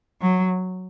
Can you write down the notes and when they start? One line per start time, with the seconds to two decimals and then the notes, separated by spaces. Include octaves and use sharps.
0.22 F#3